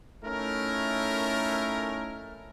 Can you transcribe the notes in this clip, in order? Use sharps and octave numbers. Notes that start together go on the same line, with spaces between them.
A3 C#4 D#4 E4 A#4